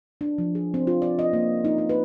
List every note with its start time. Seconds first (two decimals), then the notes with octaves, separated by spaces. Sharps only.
0.21 D4
0.38 F3
0.55 G#4
0.74 C4
0.87 F4
1.02 D5
1.19 D#5
1.33 A#3
1.65 D#4
1.78 D#4
1.89 B4